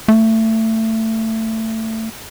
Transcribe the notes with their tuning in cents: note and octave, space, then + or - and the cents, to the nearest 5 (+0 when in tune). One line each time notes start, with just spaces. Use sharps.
A3 +20